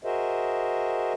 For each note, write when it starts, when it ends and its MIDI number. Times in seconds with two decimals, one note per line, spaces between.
0.05 1.13 66
0.05 1.13 68
0.05 1.13 70
0.05 1.13 72
0.05 1.13 75
0.05 1.13 76